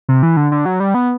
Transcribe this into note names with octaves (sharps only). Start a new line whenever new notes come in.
C3
E3
D3
D3
F#3
G3
B3